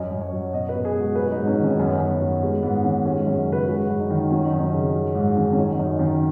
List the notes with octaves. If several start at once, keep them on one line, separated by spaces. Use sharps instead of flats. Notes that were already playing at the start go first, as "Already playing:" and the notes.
Already playing: F#2 D#5
F#2
C#5
F#3
B2 D#5
B4
B2
G#4
G#3
F#4
F#3 B4
G#2 D#4
C#4
D#3
C#4
F#2 B3
F#2
B3
F#3
G#3 B3
G#2 B3
D#3 C#4
G#3 C#4
F#4
F#2
C#3
B4
G#3 F#4
F#2
D#4
D#3
F#3 C#4
D#4
F#2
C#4
C#3
F#3
G#2
D#3 C#4
C#4
F#3 D#4
F#2 D#4
D#3 C#4